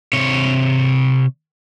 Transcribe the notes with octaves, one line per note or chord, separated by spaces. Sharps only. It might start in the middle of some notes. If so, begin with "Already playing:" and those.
C3 C#5